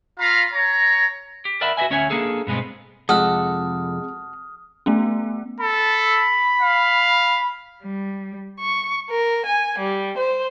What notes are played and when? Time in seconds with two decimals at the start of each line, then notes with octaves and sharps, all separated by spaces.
0.19 F4 F5 A#5 B5
0.53 C#5 A#5
1.45 G4
1.61 A#4 D5 E5 F#5 A5 B5
1.77 F#4 B4 D#5 E5 G#5
1.90 D2 C#4 C#5 E5 F#5 G#5
2.10 A#3 D4 G#4 A4
2.47 G2 B2 G#3 B3 C4
3.09 F2 C3 G#3 F#4 A4 D#6 F6
4.86 A3 B3 C#4
5.60 A4 B5
6.61 F5
7.82 G3
8.60 C#6
9.12 A#4
9.47 G#5
9.78 G3
10.18 C5